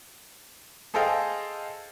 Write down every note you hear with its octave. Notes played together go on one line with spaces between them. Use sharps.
G#4 A4 C5 D#5 F5 G5